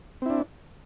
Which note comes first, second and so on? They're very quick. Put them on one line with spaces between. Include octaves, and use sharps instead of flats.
C4 E4 D4